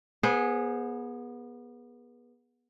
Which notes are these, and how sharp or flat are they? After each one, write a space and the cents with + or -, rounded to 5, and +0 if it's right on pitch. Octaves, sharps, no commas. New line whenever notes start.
B3 -25 G#4 +0 C5 +0